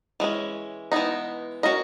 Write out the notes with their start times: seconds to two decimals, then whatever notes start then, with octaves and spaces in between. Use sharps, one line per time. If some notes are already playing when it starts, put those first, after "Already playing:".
0.20 E3 G#3 C#4
0.92 E3 G#3 B3 D#4
1.63 C#4 F#4 A#4 D#5